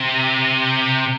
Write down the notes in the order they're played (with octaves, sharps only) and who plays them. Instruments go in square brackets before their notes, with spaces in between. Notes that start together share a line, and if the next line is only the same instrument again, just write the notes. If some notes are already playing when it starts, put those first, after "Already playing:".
Already playing: [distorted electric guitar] C3